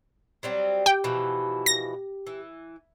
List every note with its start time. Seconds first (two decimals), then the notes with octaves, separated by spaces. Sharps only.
0.43 F#3 G3 C4
0.86 G4 G5
1.04 B2 E3 F3
1.66 A#6
2.27 E3